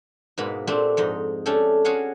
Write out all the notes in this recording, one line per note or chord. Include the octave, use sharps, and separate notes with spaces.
G#2 B2 A#3 B5
A#2 A3 C4 D4 G4
F2 G#2 D#4
A3 C#4 D4 G4 A4
C#4 F#4 G#4 F5 F#5